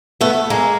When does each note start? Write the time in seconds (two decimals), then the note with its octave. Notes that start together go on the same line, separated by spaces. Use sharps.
0.21 A3 B3
0.50 G#3 A#3